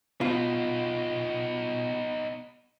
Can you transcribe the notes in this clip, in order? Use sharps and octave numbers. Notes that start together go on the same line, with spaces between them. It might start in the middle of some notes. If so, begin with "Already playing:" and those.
B2 B3 D#4 F4